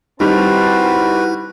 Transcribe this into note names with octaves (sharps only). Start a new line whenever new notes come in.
D#3 G3 C4 E4 F#4 B4 C5 A5